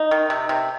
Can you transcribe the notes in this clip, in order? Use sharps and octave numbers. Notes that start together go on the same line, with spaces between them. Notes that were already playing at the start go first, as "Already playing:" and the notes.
Already playing: D#4
D#3
C3
C3